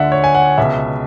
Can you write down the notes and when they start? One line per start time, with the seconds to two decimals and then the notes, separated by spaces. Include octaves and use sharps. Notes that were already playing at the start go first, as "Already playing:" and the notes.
Already playing: D2 D3 D5 E5 F#5
0.12 C#5
0.24 G#5
0.35 F#5
0.58 C#2 B2 E5